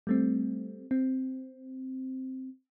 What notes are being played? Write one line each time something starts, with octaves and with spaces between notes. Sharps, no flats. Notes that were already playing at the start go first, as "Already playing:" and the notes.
G3 A3 C4
C4